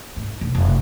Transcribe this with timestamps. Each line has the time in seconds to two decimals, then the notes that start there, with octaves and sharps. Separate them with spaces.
0.16 G#2
0.41 E1
0.55 F1